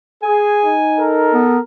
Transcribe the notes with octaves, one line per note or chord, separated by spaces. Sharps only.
G#4 G#5
D#4
A4 A#4
B3